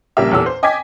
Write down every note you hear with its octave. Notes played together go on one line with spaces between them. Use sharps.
A#1 C#3 G3 A#3 G4 E5
E2 A#2 G4 A4 C#5 E6
C5
D#5 G5 G#5 D6 G#6 B6